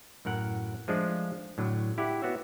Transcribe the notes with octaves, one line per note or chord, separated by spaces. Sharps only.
F#2 A2 A#4 F#5
F3 G#3 A3 D4 F4
A2 D3 F#3
E4 G4 D5 F#5
B3 F#4 C#5 E5